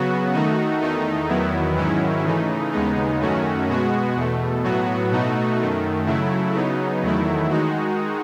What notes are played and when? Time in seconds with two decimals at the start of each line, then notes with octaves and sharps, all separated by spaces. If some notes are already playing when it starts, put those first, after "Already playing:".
Already playing: C#3 F#3 B3 F#4
0.33 D#3 A3 D#4 F#4
0.81 E2 D#3 A3 D#4
1.28 E2 D#3 F#3 B3 E4
1.77 G#2 D#3 F#3 C#4 E4
2.25 C#3 E3 A3 D#4
2.72 D#2 C#3 G#3 B3 D#4
3.20 F#2 D#3 A3 C#4 F#4
3.68 B2 G#3 B3 F#4
4.16 E2 B2 A3
4.63 A2 F#3 B3 F#4
5.11 B2 A3 D#4 F#4
5.59 F#2 D#3 A3
6.07 C#3 F#3 A3 E4
6.54 C#3 F#3 B3 D#4
7.02 E2 D#3 F#3 A3 E4
7.50 D#3 G#3 D#4 F#4